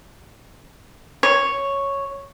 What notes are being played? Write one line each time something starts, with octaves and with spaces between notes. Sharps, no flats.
C#5